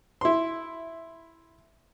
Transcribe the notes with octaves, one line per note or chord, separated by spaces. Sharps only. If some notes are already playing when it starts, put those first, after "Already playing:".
E4 C6